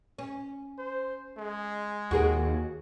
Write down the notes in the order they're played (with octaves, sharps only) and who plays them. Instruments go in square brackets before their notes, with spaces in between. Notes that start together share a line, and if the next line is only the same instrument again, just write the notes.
[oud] C#4
[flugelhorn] C5
G#3
[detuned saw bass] D#2 [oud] F#4 G#4 A#4